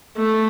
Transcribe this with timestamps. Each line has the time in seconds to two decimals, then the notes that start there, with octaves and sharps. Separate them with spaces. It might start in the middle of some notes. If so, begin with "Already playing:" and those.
0.17 A3